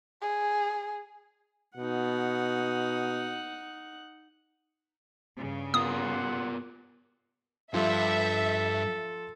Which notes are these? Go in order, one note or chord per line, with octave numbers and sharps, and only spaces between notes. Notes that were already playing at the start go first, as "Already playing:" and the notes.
G#4
B2 D#4 F#5
G2 C#3
B3 F4 G4 A#4 F#5 C6 D#6
G2 F3 A4 E5 C6